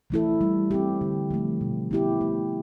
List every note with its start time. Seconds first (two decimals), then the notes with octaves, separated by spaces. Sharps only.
0.10 E3 A3 E4 A4
0.41 G3
0.71 C4 G4
1.01 D3
1.31 F3 A3
1.61 B2
1.91 B3 E4 G4
2.21 A3